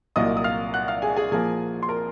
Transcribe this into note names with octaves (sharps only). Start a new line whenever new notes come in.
C2 A#2 F#3 A#3 D#5 D#6
D#6
F5 F6
F#5 F#6
F5 F6
G#4 G#5
G#4 G#5
A#2 F3 A#3 G#4 G#5
C6
A#4 A#5